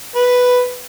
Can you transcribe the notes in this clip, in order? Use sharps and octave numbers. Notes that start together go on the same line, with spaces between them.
B4